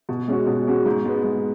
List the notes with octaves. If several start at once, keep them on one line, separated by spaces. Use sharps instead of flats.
B2
G#3 C#4 F#4
B2
G#3 C#4 F#4
G#2
G#3 B3
G#2